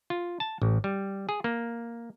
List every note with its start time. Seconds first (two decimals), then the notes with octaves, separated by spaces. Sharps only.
0.10 F4
0.40 A5
0.62 A1
0.84 G3
1.29 G#4
1.44 A#3